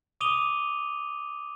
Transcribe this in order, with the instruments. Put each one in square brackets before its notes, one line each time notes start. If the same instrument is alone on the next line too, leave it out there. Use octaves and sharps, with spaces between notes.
[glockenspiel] D6 D#6 D#7 F7 G7